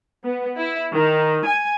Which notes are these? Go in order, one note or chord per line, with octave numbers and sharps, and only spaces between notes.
B3
E4
D#3
G#5